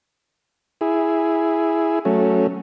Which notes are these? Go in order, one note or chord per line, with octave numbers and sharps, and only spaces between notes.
E4 G#4
F#3 A3 C#4